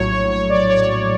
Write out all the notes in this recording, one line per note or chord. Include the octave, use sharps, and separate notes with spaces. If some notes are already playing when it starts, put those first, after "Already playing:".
Already playing: A#1 A2 F#3 C#5
C#5
C#5
D5
C#5